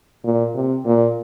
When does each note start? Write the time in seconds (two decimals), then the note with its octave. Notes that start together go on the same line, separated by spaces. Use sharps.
0.24 A#2
0.55 C3
0.86 A#2